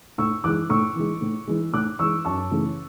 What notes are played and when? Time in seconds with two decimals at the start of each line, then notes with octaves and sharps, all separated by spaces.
0.18 A2 C#6 E6
0.44 E3 G#3 D6 F#6
0.70 A2 C#6 E6
0.96 E3 G#3
1.21 A2
1.47 E3 G#3
1.73 A2 D6 F#6
1.99 E3 G#3 C#6 E6
2.25 F#2 A5 C#6
2.51 C#3 E3 A3